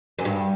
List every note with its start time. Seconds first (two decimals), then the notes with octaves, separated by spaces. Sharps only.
0.19 F#2
0.25 G2